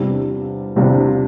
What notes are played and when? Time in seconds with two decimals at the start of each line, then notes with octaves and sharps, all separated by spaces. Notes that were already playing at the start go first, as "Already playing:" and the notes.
Already playing: E2 C3 G3 D4 F4
0.76 E2 C3 G3 D4 F4